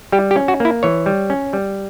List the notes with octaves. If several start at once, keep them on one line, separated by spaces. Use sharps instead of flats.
G3 G4
G4
C#4
F#4
A#3 E4
E3 C#5
G3
C#4
G3